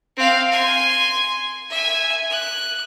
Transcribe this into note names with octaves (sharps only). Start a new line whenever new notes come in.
C4 F5
G#5 C6
E5 G#5
F#6